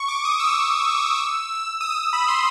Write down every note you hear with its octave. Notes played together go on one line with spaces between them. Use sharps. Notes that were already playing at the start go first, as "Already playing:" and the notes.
Already playing: C#6
D6
D#6
E6
D#6
B5
C6